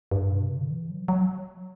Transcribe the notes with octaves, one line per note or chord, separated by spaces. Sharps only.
G2
B2
C3
D3
E3
F#3
F#3